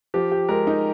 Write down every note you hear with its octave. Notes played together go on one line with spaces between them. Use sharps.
F3 G4
G4
G#3 A#4
D#4